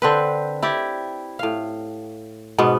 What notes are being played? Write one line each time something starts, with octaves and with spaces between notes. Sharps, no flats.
D3 C4 B4
E4 G4 D5
A2 F5
G#2 B2 B3